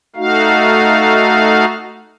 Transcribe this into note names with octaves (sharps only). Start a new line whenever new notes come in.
A3 D#4 F#4 F5